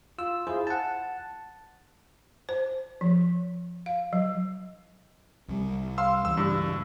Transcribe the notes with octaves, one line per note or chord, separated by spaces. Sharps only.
F4 E6
E4 F4 G#4 C5
F#5 A5
C5
F3
F5
F#3
C2 G3
F5 C6 E6
C#2 E3 E6
G2